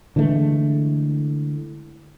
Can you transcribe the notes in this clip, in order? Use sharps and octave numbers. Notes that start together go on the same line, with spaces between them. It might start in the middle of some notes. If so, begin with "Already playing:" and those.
D3 E3 G#3 A3